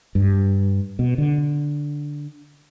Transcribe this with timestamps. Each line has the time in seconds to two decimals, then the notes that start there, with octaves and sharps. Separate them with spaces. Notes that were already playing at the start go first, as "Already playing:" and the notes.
0.15 G2
0.99 B2
1.18 D3